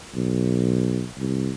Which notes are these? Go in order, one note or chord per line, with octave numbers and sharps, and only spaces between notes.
B1
C2